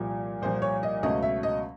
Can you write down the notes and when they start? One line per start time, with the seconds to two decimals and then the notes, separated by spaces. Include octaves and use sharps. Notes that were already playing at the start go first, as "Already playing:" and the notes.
Already playing: C2 A#2 F3
0.42 C2 A#2 F3 C5
0.62 C#5
0.83 D#5
1.03 C#2 B2 F#3 A3 C#4 D#5
1.23 E5
1.43 D#5